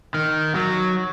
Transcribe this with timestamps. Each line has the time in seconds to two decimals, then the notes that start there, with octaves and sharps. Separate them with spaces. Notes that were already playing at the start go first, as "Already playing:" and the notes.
0.14 D#3
0.55 F#3